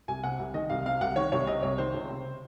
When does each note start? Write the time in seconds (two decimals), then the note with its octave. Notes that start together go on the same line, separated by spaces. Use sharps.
0.08 C2 G#5
0.23 C3 F#5
0.39 C2
0.54 D#3 D#5
0.70 C2 F5
0.86 C3 F5
1.01 C2 F#5
1.16 D#3 C#5
1.32 C2 C#5
1.47 C3 D#5
1.63 C2 C#5
1.78 D#3 C5
1.94 C#2
2.09 C3